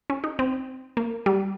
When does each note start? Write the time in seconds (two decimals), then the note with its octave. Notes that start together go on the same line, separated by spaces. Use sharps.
0.10 C#4
0.24 D#4
0.39 C4
0.97 A#3
1.26 G3